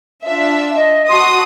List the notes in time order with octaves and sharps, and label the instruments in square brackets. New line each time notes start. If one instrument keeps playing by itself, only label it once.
[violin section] D4 F4 E5
[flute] D#5
[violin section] F#4 A5 D#6 [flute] C6